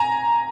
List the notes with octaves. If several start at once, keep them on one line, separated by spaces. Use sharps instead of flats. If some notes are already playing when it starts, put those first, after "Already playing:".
Already playing: G#5 A#5